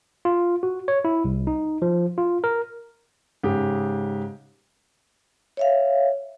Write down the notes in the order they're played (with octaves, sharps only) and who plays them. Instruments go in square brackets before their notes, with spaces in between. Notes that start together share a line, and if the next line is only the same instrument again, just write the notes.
[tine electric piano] F4
F#4
C#5
E4
C2
D#4
F3
F4
A#4
[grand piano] G#2 C#3 G4
[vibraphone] C#5 E5 F5